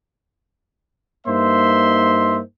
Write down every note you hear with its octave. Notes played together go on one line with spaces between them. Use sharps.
G2 A#3 D#4 C5 E5 C6